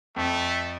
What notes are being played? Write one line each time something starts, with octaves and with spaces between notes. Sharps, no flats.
F2 A3